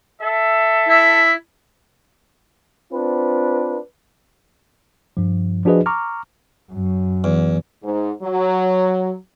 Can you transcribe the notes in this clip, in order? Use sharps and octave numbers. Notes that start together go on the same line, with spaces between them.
A4 E5
E4
C4 D4 F4 B4
G2 F3
F3 D4 F#4 G#4 B4 D#5
A#5 C#6 D6 F6
F#2
E2
G#2
F#3